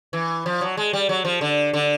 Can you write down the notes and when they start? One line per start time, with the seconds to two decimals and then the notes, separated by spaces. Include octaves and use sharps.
0.13 E3
0.46 F3
0.61 F#3
0.77 G#3
0.93 G3
1.09 F#3
1.25 F3
1.41 D3
1.73 D3